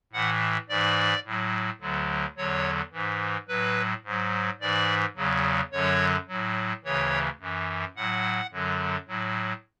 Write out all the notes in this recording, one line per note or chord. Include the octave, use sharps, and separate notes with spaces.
A2 E3 F#5
G#2 E3 D5
A2 F#3
D2 D3 F#3
E2 D3 F#3 C#5
G#2 E3
A2 F#3 B4
G#2 F#3
G#2 E3 D5
E2 C#3 F#3
F#2 D3 F#3 C#5
A2 F#3
D2 C#3 E3 C#5
F#2 E3
A2 F#3 F#5
F#2 D3 F#3
A2 F#3